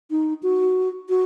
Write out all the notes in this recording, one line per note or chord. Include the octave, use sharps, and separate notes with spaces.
D#4
F#4
F#4